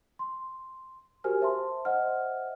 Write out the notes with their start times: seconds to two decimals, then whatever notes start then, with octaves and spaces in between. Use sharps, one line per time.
0.19 C6
1.24 F#4 G4 A#4 C5 G#5 F6
1.41 C5 E5 A5 C6
1.85 C5 D#5 E5 F#5 F6